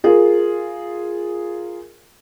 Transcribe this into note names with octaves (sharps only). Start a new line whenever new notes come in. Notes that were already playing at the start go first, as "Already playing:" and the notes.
F4 G#4 A#4